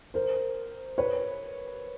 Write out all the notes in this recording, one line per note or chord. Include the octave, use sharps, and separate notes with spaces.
A#4 C5
B4 C#5